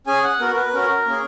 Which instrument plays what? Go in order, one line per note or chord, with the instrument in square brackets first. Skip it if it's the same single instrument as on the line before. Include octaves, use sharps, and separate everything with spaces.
[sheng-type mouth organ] C#4 G#4 G#5
F#5
B3 F#4 A#4
A#4
B4
C#4 F#4 A#4
A#3 C#4 G#4